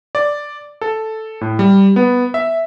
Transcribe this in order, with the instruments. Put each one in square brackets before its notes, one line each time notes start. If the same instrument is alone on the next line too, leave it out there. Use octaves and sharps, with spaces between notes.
[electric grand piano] D5
A4
A2
G3
B3
E5